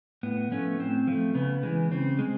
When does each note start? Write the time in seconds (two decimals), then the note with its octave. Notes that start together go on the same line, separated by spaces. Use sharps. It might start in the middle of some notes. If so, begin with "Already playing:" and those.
0.23 A2 B3
0.51 F3 A3 B3 C#4
0.79 A2 C4
1.07 F3 A3
1.35 C#3 B3
1.63 E3 G#3
1.91 C#3 C4
2.19 G#3